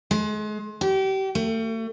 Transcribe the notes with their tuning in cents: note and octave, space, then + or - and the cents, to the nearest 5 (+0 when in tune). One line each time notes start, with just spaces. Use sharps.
G#3 +35
G4 -30
A3 +40